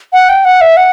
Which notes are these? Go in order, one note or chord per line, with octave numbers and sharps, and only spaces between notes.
F#5
G5
F#5
E5
F#5